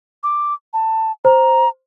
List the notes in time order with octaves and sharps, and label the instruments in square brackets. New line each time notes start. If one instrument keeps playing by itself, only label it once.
[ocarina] D6
A5
[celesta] C5 [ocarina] A#5